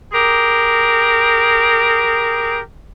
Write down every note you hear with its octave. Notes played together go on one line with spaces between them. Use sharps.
G4 G#4 A#4